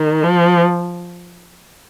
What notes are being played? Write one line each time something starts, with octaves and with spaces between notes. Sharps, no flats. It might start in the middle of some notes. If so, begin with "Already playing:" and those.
Already playing: D#3
F3